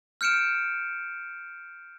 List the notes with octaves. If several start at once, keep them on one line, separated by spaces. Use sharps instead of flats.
F6 G6 C#7 D7 E7